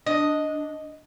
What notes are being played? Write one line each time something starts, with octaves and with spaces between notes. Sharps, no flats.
D4 D#5